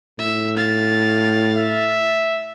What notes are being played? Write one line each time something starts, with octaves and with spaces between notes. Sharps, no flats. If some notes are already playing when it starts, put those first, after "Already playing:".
A2 E5
F5 A6
E5